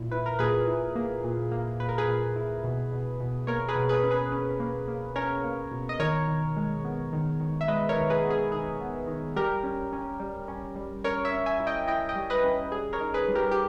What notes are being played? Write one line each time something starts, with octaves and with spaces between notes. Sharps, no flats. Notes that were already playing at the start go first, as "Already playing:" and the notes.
Already playing: A#2 E4
E4 B4
A#4
A#2 G#4 B4
E4
A#3
A#2
A#3
A#2 B4
A#4
G#4 B4
A#2
E4
B2
B2
B2
A#3 A#4 C#5
G#4 B4
B2
G#4 B4
C#4
G#4 B4
C#4
A#3
A#3
C#4 A#4 C#5
A#3
B2
D#5
D#3 A#4 C#5
D#3
G#3
B3
D#3
D#3
E5
G#3 B4 D#5
A#4 C#5
D#3
G#4 B4
B3
G#4
D#3 G#4
B3
D#3
G3 G4 A#4
C#4
C#4
G3
C#4
G3
C#4 A#4 C#5
C#5 E5
C#4
E5 G#5
E4
D#5 G5
E4 D#5 G5
D#5 G5
G3
B4 D#5
C#4
G3 G#4
A#4 C#5
D#4
G#4 B4
G3
G4 A#4
G4